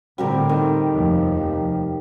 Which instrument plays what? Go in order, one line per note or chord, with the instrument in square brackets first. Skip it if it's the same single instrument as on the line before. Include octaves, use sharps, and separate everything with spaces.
[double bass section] A2 D3 C4 [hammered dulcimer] G3 G4 A#4
[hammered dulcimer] D#3
[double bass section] F1 D#2 F3